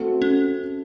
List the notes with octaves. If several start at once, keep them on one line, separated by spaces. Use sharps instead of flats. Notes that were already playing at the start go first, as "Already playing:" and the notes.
Already playing: A3 C4 F#4
C#4